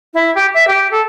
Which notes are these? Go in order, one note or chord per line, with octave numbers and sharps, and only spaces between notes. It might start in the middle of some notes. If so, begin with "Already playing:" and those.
E4
G4
E5
G4
A4